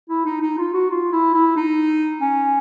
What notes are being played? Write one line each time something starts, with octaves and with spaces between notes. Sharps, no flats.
E4
D#4
D#4
F4
F#4
F4
E4
E4
D#4
C#4